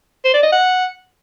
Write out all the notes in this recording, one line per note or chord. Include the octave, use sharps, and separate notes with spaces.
C5
D5
D#5
F#5